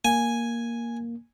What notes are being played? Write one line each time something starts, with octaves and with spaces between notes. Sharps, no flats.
A#3 G#5